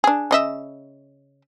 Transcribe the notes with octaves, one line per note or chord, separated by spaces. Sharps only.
D4 G#4
C#3 D#5 E5